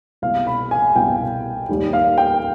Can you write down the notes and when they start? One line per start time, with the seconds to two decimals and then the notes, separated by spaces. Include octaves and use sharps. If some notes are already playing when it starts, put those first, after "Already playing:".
0.22 C2 B2 G3 F5
0.47 B5
0.71 G#5
0.96 C2 B2 G3 G5
1.69 D#2 D#3 G3
1.93 F5
2.18 G5